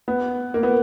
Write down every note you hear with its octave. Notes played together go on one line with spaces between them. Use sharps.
B3
A#3
B3